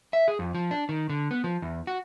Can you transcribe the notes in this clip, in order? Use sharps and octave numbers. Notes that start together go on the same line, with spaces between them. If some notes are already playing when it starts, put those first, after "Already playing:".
E5
G#4
F2
F3
D4
D#3
D3
B3
F3
E2
F#4